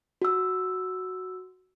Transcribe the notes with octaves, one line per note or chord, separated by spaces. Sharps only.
F#4 E6